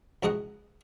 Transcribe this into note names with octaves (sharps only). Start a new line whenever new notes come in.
C#2 E4 F#4 G#4 D#5 F#5